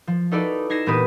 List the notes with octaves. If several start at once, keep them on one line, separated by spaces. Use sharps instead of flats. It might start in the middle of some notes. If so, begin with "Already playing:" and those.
F3
D#4 E4 F#4 A4 B4 D5
D#4 G#6 A#6 C7 E7
E1 A#2 B3 G4 B4 D#6